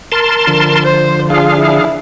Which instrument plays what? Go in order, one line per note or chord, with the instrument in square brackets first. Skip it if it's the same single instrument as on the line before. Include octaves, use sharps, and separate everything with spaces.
[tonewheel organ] A#4 A5 C6
[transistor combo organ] D3 F3
[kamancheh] C5
[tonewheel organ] D4 G#4 F5 [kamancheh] F4
[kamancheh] E4